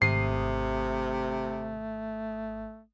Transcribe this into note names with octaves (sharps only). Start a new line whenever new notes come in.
G#1 C3 A3 D#6 C7